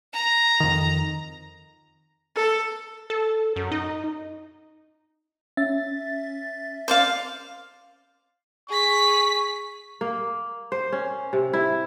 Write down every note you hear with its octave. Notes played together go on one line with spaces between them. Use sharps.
A#5
F2 D#3
A4
A4
F#2
D#4
C#4 E5 A6
C5 D5 F5
G#4 C#6 B6
A#3
C5
C#4
C3
E4